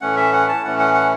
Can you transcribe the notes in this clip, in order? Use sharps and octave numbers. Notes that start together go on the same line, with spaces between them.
A2 E3 A3 C#4 F#5
E5
F#5
A5
A2 E3 A3 C#4 F#5
F#5
F#5